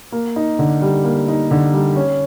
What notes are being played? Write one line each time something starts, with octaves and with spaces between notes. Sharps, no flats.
A#3
D#4
D3
G3
A#3
D#4
D3
G3
C#4